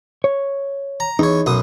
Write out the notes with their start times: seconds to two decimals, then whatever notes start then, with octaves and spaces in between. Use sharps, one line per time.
0.24 C#5
1.00 A#5
1.19 E2 D#4 C#5
1.46 B1 F#2 D#6